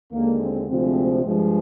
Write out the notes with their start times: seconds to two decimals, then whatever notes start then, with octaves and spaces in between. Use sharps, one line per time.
0.11 D#2 D3 G#3 A#3
0.39 C4
0.67 D2 C3 F3 G#3 C4
1.23 G2 F3 G#3